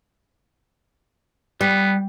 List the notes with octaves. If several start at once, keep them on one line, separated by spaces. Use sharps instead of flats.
G3 B3